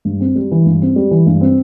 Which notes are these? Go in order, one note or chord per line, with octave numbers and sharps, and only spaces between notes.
G2
C4
G3
E3
G2
C4
G3
E3
G2
C4